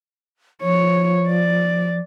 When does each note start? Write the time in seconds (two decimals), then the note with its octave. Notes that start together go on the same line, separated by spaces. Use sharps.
0.62 F3 C#5
1.28 D5